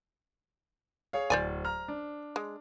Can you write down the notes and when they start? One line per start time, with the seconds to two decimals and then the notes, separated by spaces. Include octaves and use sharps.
1.13 G#4 C#5 F5
1.30 D1 C5 D5 G#5
1.65 A#5 F6
1.88 D4
2.36 G#3